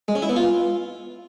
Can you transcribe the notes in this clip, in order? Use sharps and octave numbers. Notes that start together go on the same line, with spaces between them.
G#3
C#4
E4
B3
F4